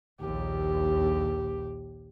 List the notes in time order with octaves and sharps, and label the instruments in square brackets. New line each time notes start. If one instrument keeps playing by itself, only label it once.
[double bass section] A#1 D#2 [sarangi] G4